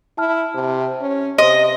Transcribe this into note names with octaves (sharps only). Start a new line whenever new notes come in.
E4 A5 F6
C3
C#4
C3 C5 D#5 C6